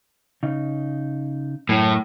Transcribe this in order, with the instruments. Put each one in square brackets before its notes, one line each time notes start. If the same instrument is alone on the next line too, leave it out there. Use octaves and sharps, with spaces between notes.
[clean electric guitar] C#3 D#4
[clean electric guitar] F#2 [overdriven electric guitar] A2